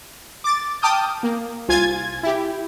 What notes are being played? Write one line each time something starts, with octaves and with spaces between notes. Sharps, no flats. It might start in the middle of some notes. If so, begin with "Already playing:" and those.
D6 A6
G5 A5 D6 D#6 F6 G6
A#3
C2 F4 G#5 G#6 A6
E4 G4